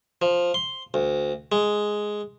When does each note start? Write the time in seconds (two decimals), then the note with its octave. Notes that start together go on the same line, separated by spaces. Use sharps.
0.22 F3
0.54 C6
0.94 D2
1.52 G#3